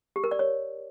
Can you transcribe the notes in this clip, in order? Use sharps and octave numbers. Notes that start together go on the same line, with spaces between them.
G4
A#4
D5
C#5